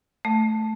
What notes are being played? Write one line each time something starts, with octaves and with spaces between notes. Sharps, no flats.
A3